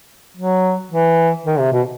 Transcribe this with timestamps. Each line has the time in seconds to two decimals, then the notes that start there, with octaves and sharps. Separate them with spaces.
0.37 F#3
0.91 E3
1.46 D#3
1.59 C3
1.72 B2